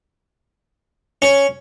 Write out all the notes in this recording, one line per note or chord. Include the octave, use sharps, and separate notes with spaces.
C#4